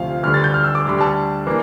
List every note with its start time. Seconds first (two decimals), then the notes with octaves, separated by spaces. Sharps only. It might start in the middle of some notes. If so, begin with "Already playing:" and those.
Already playing: D2 C3 F3 F5
0.23 D2 D3 G3 F6
0.34 A6
0.44 G6
0.54 F6
0.64 E6
0.75 D6
0.85 D2 D3 G3
1.01 A5
1.46 E3 A#3 D4